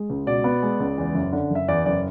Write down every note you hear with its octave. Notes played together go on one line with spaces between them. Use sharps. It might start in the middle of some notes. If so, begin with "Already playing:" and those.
Already playing: G#3
C#2
B2 D5
B3
G#3
C#2
E2
F#1
D3
F#1
E5
E2 D5
F#1 D5